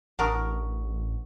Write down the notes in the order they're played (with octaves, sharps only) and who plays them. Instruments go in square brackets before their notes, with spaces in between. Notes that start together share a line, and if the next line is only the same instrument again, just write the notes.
[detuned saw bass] A1 [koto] D4 A#4 [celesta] F#5 C#6 D#6